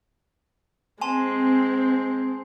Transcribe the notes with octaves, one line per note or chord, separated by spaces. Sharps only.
G#3 C4 G#5 A5 C6